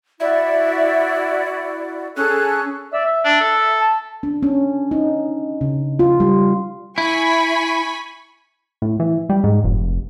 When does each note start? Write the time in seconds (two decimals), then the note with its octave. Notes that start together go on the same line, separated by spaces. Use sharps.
0.20 E4 F#4 D5 E5
2.17 C#4 G#4 A4 F#6
2.93 D5 E5 E6
3.06 E5
3.25 D4
3.41 A4
3.81 A5
4.23 D4
4.43 C#4
4.91 D#4
5.61 C#3
5.99 F4
6.20 G3
6.98 E4 G#5 B5 C#6
8.82 A2
9.00 E3
9.29 G3
9.44 G#2
9.64 F1